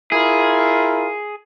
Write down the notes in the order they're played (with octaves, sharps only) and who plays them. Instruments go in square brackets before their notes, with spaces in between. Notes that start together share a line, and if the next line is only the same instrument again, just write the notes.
[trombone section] E4 F4 A#4 [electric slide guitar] G#4